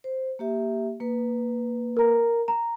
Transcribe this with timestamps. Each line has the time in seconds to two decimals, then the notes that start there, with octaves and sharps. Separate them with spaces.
0.04 C5
0.39 A#3 G4 E5
1.00 A#3 B4
1.97 A#4 A#5
2.48 A#5